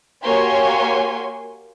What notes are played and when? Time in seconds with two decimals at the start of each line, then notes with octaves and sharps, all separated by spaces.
0.24 A#3 F#4 G4 C#5 G#5 C6